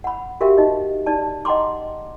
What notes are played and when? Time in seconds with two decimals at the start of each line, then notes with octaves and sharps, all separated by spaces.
0.04 F#5 B5
0.41 F#4 G4 A#4 E5 F5 G5
0.58 D#4 D#5
1.06 D#4 D5 A5
1.45 D#5 F#5 G5 A#5 C6 D6